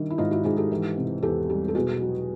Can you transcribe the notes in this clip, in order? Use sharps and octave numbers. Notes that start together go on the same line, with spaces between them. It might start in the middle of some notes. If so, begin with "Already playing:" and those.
Already playing: D#3 G3 D4 E4
E4
G#2 D#4 F4
E4 F#4
G#2 F#4 G#4
G4 A4
E3
C3
E2 G4 A4
G3
A4
B2 F#4 G#4
F#3